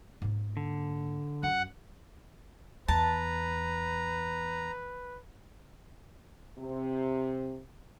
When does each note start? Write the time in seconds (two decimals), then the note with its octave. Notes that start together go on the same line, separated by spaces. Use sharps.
0.22 G#2 A#3
0.57 D3
1.43 F#2 F#5
2.88 E2 B4 A5 A#5
6.58 C3